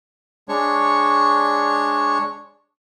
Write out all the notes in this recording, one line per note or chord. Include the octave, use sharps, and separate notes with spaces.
G#3 D4 C#5 C#6